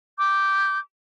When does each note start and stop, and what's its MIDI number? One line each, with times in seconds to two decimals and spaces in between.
0.19 0.78 86
0.19 0.78 91